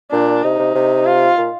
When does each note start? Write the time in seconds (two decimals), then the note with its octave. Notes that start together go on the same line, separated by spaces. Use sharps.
0.12 A#2 D4
0.44 C3 D#4
0.59 C3
0.75 C3
1.06 F4
1.38 A#2